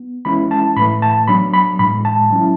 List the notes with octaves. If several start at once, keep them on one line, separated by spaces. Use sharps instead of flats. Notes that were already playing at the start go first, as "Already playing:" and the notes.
Already playing: B3
E3 G#3 C#4 E4 B5
A5
A2 E3 A3 B5
A5
F#3 B3 D4 B5
B5
A2 E3 G#3 B5
A5
F#3 C#4 E4